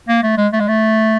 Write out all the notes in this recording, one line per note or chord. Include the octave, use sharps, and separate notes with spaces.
A#3
A3
G#3
A3
G#3
A3